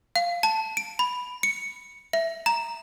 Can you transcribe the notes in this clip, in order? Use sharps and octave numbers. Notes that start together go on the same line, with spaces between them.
F5
A5
D7
B5
C#7
E5
A#5